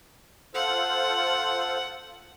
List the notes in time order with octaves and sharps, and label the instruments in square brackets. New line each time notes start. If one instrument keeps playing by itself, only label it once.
[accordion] F4 A4 C5 [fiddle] F#5